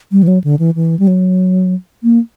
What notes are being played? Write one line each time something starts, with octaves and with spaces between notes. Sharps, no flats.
G3
E3
F#3
D3
E3
E3
G3
F#3
A#3